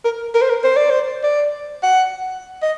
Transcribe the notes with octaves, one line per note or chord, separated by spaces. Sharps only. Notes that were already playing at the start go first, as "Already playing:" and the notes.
A#4
A#4
C5
A#4
C5
D5
C5
D5
F#5
D#5